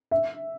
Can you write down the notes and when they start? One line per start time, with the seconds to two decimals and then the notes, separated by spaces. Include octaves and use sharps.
0.11 E5